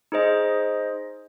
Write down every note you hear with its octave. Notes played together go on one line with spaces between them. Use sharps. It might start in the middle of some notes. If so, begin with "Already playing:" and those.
D#4 G#4 C5 D#5